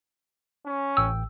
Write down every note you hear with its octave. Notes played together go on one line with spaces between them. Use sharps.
C#4
A1 A2 G5 E6